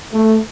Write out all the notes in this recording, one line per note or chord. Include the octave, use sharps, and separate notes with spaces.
A3